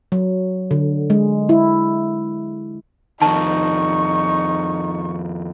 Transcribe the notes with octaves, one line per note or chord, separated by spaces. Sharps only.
F#3
D3
G#3
E4
F2 D#3 D#4 A5 C#6